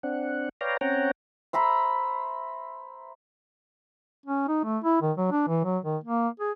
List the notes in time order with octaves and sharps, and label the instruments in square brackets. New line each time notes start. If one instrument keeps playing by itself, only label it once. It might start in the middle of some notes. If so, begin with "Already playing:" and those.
[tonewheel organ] C4 D4 F#5
B4 C#5 D5 F5 G5 A#5
C4 C#4 C#5 F#5 G5 A#5
[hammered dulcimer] C5 E5 A#5 B5
[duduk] C#4
D#4
A3
E4
D#3
F#3
D4
E3
F#3
D#3
A#3
G#4